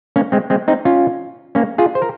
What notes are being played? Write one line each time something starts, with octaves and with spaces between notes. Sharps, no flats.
A#3 C#4
G#3 C4
G#3 C4
C4 D#4
C#4 F4
A#3 C#4
F4 G#4
C5
A#4